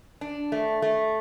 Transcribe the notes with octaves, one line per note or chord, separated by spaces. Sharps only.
D4
A3
A3